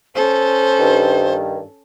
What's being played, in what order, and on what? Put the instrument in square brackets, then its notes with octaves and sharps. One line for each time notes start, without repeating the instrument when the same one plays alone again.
[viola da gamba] C#4 A4 [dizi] C5
[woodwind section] G2 D#3